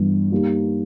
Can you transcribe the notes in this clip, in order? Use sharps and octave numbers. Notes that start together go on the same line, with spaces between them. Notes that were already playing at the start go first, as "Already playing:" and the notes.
Already playing: G2 E3 G3 B3
G3 A#3 D#4 G4